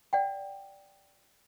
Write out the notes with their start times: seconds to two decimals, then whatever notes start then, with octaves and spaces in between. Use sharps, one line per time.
0.13 D5 F#5 G5